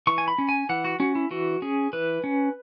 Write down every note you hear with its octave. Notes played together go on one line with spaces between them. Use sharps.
E3 C#6
G#5
B5
C#4
G#5
E3 F#5
F#4
C#4 F#4
E4
E3 F#4
C#4 G#4
E3 B4
C#4